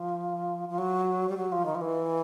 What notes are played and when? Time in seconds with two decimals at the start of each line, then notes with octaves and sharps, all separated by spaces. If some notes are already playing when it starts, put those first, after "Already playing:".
Already playing: F3
0.69 F3
0.78 F#3
1.29 G3
1.37 F#3
1.52 F3
1.66 D#3
1.75 F3
1.81 E3